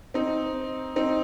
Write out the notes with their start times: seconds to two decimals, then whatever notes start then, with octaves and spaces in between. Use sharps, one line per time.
0.14 C4 D#4
0.96 C4 D#4